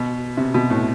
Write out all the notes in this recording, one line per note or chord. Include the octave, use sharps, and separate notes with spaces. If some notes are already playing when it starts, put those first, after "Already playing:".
Already playing: B2
C3
B2
A2